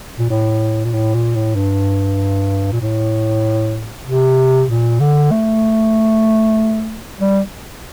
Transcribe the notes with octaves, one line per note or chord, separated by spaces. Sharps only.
A#2
A2
A#2
A2
A#2
A2
G2
A#2
A2
C3
A#2
D3
A3
G3